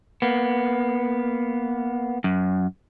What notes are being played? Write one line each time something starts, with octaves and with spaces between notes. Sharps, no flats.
A#3 B3
F#2